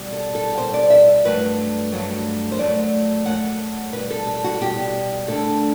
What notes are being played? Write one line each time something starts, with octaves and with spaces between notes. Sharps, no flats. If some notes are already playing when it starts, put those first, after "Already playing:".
Already playing: B2 G3
A4
A4
B2 G3 C5
D5
E5
G2 F#3 A3 B4
G2 F#3 A3
C5
F#2 F#3 A3 D5
F#2 F#3 A3 F#5
B2 G3 B4
A4
A4
F#4
B2 G3 G4
D2 D3 A3 A4